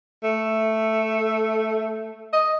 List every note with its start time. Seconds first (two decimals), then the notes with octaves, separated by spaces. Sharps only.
0.24 A3
2.33 D#5